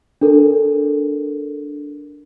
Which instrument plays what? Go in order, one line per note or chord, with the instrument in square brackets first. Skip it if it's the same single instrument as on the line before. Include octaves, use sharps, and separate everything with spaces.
[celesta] D4 A4 A#4